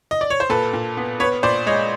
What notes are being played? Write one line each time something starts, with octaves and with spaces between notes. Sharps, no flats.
D#5
D5
C#5
C5
A#2 A4 B4
A#2
B3
B3 B4 C#5
A#2 C5 D5
G#3 C#5 D#5